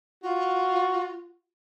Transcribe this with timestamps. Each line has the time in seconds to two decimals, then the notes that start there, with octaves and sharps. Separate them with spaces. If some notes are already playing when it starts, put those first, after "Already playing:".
0.23 F4 F#4